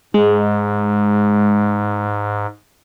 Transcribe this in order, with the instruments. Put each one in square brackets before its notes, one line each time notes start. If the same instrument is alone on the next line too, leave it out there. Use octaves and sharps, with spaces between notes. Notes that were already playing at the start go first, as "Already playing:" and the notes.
[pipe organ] G#2 [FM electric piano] G#3